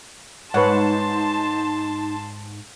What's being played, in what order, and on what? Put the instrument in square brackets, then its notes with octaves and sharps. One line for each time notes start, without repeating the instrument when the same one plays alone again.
[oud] G#2 [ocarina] D#4 [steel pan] B4 C#5 F#5 [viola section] A5 C6